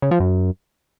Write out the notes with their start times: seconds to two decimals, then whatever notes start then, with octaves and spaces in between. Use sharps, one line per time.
0.02 C#3
0.11 F3
0.20 F#2